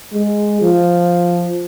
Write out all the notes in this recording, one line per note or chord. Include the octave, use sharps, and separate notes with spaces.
G#3
F3